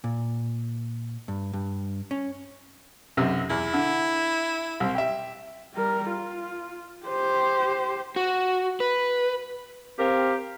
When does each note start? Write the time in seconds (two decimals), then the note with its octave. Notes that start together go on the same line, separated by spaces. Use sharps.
0.04 A#2
1.28 G2
1.53 G2
2.11 C#4
3.17 B1 F#2 C3
3.50 E2 E4
3.74 D3
4.80 C2 C4
4.95 G4 E5
5.74 G3 A#4
6.10 F4
7.06 G4 C5
8.16 F#4
8.80 B4
9.98 C4 G4 A#4 F5